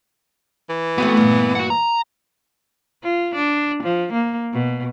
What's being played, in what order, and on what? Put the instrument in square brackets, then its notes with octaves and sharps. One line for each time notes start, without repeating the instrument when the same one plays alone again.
[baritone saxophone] E3
[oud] A3 C4 F#4 [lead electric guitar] B3
[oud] G2 A#2
[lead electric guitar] F#4 F#5
A#5
[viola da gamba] F4
D4
F3
A#3
B2